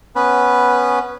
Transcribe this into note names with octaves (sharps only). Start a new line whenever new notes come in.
B3 C#4 B4